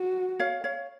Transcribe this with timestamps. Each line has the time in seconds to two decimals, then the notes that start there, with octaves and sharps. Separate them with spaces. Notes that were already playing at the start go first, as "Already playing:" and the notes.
Already playing: F#4
0.39 C#5 F5
0.64 C#5 F5